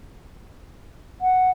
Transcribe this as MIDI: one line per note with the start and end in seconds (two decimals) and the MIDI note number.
1.21 1.51 78